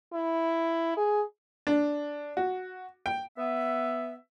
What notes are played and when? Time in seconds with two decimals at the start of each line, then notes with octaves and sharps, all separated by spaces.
0.13 E4
0.97 G#4
1.67 D4
2.37 F#4
3.06 G5
3.37 B3 E5